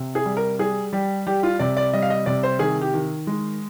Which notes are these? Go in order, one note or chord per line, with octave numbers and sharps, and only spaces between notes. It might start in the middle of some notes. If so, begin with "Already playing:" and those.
Already playing: C3
G#4
G3
A#4
G3 G#4
G3 G4
G3 G4
F4
C3 D5
D5
G3 D#5
F5
D#5
C3 D5
C5
D#3 G#4
G4
D#3
G#3